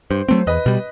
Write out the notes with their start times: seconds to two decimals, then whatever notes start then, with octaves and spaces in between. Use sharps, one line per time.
0.10 G2 C5
0.28 F#3 A3 C4 C5
0.47 E2 B4 D#5
0.66 B2 G3